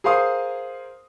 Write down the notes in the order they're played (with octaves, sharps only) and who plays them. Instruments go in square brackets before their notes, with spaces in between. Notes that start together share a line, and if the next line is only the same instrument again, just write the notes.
[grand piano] G#4 A#4 C5 F5 C6 D#6